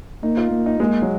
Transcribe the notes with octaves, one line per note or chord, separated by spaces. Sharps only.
A#3 D#4
F4
A#3
D#4
G#3 A#3
F#3